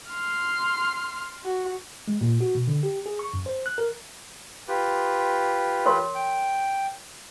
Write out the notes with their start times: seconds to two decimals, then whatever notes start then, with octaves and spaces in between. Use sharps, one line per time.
0.11 C6 F6
1.44 F#4
2.08 G#3
2.21 A#2
2.41 F#4
2.55 B2
2.67 D3
2.83 G4
3.06 G#4
3.19 C#6
3.33 F#2
3.46 C5
3.66 F#6
3.78 A#4
4.68 F4 G4 B4
5.86 A#4 C#5 C6
6.15 G5